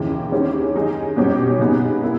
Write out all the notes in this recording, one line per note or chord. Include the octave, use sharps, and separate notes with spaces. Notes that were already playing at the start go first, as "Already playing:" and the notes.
Already playing: D#2 C#3 E3
D#3 G#3 C#4 E4 G4
D#3 G#3 D#4 G#4
B2 G3 C#4 G4
C#3 G#3 B3 D#4 G#4
B2 A#3 E4